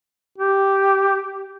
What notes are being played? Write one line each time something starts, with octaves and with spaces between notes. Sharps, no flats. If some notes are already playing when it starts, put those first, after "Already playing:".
G4